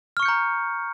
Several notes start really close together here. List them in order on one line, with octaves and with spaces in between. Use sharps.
F6 C#6 C#7 G6 A#5